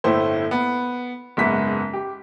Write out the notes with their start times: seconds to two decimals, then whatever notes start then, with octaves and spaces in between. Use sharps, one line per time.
0.04 G1 A2 A3 E4 C5
0.51 B3
1.37 F#1 G#2 B3 E5 B6
1.93 G4